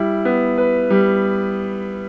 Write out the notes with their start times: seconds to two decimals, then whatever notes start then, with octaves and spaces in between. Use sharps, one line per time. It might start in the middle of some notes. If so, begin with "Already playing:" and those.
Already playing: G3 E4
0.25 B3
0.58 B4
0.90 G3